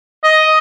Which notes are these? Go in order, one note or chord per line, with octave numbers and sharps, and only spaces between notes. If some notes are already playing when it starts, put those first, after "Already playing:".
D#5